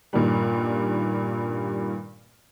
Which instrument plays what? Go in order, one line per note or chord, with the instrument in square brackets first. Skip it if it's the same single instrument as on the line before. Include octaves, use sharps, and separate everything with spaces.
[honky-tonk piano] G2 A#2 D#3 G3